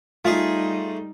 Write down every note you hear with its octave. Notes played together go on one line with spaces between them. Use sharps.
G3 A3 D#4 F4 G#4